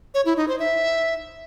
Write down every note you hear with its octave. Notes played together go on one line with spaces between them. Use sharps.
C#5
E4
D#4
C5
E5